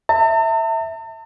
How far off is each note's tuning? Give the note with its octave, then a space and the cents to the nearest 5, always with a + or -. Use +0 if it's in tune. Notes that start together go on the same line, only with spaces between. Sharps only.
E5 -10 A5 +45